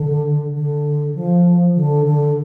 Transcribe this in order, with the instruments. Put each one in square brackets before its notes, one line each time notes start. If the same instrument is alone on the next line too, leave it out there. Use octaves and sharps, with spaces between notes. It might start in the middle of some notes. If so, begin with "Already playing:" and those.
Already playing: [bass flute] D3
D3
F3
D3
D3